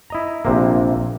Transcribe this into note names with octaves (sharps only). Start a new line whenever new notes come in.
E4 D#5 A#5
A#1 C3 A#3